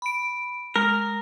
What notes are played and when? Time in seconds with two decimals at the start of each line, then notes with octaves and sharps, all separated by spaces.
0.02 B5 D7
0.76 G#3 A#4